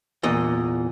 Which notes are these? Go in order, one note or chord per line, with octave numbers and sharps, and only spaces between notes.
E2 A#2 D#5